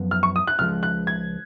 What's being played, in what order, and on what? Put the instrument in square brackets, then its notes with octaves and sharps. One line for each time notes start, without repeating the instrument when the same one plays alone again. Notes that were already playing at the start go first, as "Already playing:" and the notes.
Already playing: [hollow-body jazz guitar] F#2 F3 B3
[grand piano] F6
C#6
D#6
F#6
[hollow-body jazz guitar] C#2 C#3 F3 G#3 [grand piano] F6
[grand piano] F#6
G#6